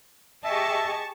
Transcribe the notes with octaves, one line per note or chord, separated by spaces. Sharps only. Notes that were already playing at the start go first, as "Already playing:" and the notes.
G4 G#4 D#5 E5 A5 C#6